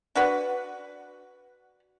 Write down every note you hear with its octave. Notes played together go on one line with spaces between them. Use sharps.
D4 F#4 B4 F#5